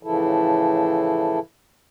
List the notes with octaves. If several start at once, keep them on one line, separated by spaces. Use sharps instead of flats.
A2 C#3 E3 F3 E4 A4